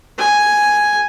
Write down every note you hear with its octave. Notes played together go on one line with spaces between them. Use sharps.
G#5